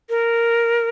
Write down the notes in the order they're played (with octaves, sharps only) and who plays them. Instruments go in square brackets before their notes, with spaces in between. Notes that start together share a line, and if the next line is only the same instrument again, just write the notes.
[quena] A#4